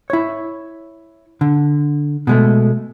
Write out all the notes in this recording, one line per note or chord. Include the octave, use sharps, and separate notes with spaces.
E4 C#5
D3
B2 G#3 A3